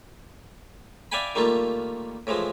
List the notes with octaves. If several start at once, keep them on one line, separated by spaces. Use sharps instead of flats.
D5 E5 F5 G5 G#5 B5
D#3 G3 A3 A#3 F4
A2 E3 F3 G#3